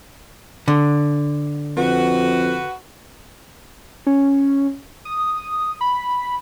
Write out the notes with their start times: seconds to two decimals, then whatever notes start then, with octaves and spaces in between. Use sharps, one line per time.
0.68 D3
1.77 F2 F#4 B4
4.07 C#4
5.05 D#6
5.81 B5